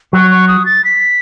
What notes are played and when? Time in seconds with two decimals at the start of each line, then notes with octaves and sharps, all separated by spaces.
0.13 F#3 C#6
0.31 C#6
0.48 D#6
0.66 A6
0.85 B6